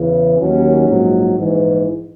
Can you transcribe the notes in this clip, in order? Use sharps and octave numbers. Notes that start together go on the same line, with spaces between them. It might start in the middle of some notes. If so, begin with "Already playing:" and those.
Already playing: E2 C#3 E3
D#2 D#3 F#3 C#4
A#1 G#2 F#3
A#1 G#2 E3